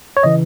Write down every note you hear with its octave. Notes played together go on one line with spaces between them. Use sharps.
C#5
C#3 E3 D#5